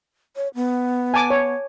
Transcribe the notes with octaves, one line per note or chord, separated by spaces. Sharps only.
C#5
B3
G#5 A5 D6
C#5